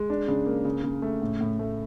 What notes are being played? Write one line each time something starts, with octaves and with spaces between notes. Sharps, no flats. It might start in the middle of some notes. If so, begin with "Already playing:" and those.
Already playing: G#3
D4
C#3
A#3
C#3
C#3
A3
A2
A2
A3